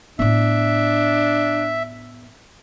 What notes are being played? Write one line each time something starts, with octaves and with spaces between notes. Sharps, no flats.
A2 B3 D4 E5